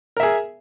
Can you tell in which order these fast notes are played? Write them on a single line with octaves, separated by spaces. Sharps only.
A#4 E5 G#4